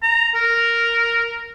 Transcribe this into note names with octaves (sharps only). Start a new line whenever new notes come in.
A#5
A#4